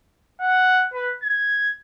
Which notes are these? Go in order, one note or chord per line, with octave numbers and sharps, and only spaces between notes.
F#5
B4
G#6